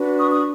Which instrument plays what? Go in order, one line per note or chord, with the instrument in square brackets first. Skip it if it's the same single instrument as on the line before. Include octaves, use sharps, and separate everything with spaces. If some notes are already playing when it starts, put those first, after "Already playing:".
Already playing: [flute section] D4 F#4 B4
C#6 D#6
D#6